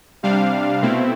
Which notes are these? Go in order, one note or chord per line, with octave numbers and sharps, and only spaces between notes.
C3 G3 D4 F5
B2 A3 C4 E4